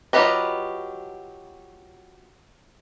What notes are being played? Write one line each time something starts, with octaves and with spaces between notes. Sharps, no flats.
F#3 F4 G4 B4 D#5